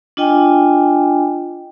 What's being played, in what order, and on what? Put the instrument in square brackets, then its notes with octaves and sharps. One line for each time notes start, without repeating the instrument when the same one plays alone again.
[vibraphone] D4 F4 D#5 G5 G#5